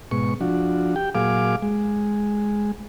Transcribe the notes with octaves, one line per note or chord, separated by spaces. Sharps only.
G#2 B2 C#6
F3 D4 F#4
G4 G5
A#2 F#3 G#4 F5 D6
G#3